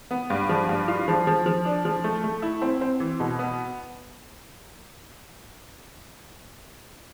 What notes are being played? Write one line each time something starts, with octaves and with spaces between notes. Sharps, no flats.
B3
G2
F3
G2
F4
F3
F3
F3
D4
F3
A3
A3
E4
C4
C4
E3
B2
B3